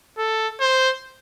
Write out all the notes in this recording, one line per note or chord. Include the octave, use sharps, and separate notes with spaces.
A4
C5